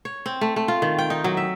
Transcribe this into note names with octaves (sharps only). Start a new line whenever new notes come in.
C#5
C4
A3
A3
F4
D#3
G5
D#4
F#3
E5